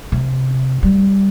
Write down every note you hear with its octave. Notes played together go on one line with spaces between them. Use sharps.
C3
G3